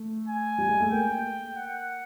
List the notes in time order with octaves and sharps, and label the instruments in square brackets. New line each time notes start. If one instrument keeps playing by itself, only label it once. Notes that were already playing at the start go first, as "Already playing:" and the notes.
Already playing: [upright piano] A3
[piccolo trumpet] G#5
[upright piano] G3
G#3
A3
[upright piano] A#3 [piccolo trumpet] G5
[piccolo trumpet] F#5